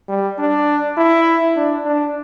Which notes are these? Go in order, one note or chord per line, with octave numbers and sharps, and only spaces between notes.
G3
D4
E4
D4
D4